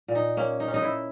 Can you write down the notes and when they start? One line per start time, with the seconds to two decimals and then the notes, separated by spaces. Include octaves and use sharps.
0.08 A#2
0.15 D#4
0.37 A#3 C#4
0.60 D#4
0.68 C#4
0.74 D#4
0.82 E4